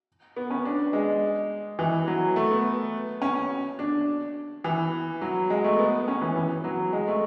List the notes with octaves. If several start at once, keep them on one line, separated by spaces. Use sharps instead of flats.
B3
C#4
D4
G#3
E3
F#3
A3
B3
C#4
D4
E3
F#3
G#3
A3
B3
C#4
E3
E3
F#3
G#3
A3